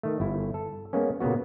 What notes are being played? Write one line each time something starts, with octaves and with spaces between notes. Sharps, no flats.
D#3 A3
G1 E4
A4
G#3 A#3 B3 C#4
A#2 C#3 A#3 B3 F#4